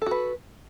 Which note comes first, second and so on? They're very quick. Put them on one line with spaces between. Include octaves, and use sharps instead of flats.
A4 F#4 B4